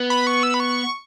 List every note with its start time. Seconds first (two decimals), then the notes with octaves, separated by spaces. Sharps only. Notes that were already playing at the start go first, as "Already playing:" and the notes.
Already playing: B3
0.10 B5
0.27 C#6
0.43 E6
0.54 B5
0.60 C#6